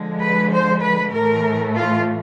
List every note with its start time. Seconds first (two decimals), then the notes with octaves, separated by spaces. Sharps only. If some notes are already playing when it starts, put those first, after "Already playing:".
Already playing: D3 F3 G#3
0.20 B4
0.50 C5
0.81 B4
1.12 A2 E3 A3 A#4
1.75 F4